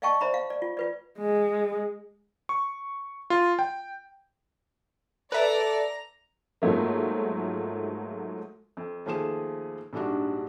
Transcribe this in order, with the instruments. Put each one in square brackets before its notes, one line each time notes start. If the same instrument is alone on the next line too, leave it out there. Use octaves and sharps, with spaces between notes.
[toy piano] D5 D#5 F5 G5 A5 C#6
C5 D5 E5 A#5 B5
F5
D5
F4
F4 B4 D5
[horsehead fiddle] G#3
[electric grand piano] C#6
F4
G5
[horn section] A4 [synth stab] B4 E5 [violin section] D5 [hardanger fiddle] A#5
[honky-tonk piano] G#2 F3 F#3 A3 A#3
[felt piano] F2
D#2 F3 A3 G#4 E7
A#1 G#2 G3 D4 F#4